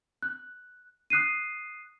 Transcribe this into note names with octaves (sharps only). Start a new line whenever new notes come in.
F#6
D#6 F#6 C7 D#7